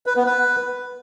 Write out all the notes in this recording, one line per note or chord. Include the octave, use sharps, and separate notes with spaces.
B4
B3
B4